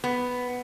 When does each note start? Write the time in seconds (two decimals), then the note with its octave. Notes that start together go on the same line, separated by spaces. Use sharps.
0.04 B3